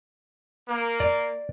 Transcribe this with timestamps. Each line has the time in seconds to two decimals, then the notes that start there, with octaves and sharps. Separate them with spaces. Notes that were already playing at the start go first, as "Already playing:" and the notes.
0.68 A#3
1.00 D5